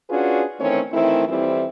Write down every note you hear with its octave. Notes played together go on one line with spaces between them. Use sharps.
C#4 D4 F4 F#4 G#4 B4
D#3 E3 A3 C4 C#4 C#5
D#3 E3 A3 C4 E4
F2 E3 G3 C4 E4